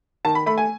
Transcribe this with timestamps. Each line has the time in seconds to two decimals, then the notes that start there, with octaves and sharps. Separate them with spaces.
0.25 D#3 A5
0.35 B5
0.46 A3 B5
0.58 G#5